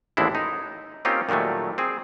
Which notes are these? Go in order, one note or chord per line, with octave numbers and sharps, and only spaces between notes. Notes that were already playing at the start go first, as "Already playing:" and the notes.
A1 D#2 G#3 C4 D4 E4
D#4
A#3 C4 C#4 D#4 F4 G4
A#2 D#3 F#3 G3 A3
C4 G#4